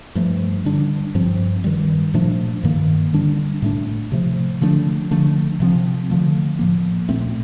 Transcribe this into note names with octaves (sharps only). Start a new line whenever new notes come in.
G2 F3 A3
D3 G3 D4
G2 F3 C4
G2 D#3 G3
A#2 F3 A3 D4
G2 D#3 A#3
D3 G3 D4
A2 A3 D4
C3 F3 A3
D3 F3 A3 D4
D3 F3 A3 D4
C3 F3 C4
D3 F3 A3
A2 F3 A#3
A#2 A3 C4